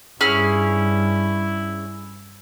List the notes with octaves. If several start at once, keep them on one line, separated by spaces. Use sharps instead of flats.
G2 C#4 E4 G#4 F6